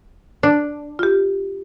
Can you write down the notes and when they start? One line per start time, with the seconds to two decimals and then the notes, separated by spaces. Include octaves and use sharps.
0.43 D4
0.99 F4 G4